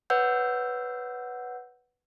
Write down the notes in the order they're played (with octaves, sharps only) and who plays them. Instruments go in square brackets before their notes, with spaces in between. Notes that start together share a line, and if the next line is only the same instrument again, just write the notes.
[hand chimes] B4 C#5 F#5 E6 G6